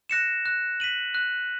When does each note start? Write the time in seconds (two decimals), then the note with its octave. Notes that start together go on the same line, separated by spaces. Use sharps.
0.09 F#6 A#6 C#7 E7
0.46 F#6
0.80 B6 D#7 F#7
1.15 F#6